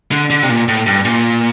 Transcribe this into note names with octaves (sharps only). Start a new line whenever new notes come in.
D3
D3
C3
A#2
A2
G2
A#2